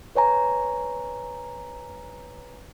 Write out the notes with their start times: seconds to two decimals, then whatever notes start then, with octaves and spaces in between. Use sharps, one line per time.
0.15 B4 C#5 G#5 A#5